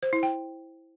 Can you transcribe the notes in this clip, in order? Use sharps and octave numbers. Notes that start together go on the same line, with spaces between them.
C5
E4
G5